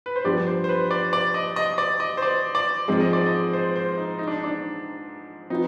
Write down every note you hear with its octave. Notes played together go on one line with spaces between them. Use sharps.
B4
C5
G2 F3 B3 D4 G4 D5
C5
C5
B4
D5
D5
D#5
D#5
D5
D#5
C5
D5
D5
G#2 F3 G#3 C4
D#5
D5
D#5
C5
C5
D#4
D#4
D4
D4
F3 C4 D#4 F4 B4